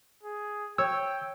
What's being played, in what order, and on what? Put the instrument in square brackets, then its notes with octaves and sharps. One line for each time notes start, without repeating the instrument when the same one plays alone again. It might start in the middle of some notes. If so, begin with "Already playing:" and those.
[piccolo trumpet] G#4
[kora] C#5 [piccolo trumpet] G5 [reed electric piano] E6